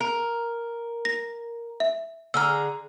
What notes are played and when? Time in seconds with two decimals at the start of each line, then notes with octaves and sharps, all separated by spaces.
0.01 A#4
1.05 A#6
1.80 E5
2.34 D3 G#4 A#5 E6 F6